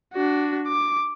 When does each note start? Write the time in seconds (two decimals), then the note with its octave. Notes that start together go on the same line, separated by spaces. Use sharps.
0.13 D4 F#4
0.67 D6